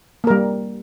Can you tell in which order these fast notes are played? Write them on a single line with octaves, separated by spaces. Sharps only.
A#3 A#4 G3